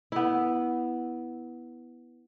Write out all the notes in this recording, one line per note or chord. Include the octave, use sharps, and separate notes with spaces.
B3 E4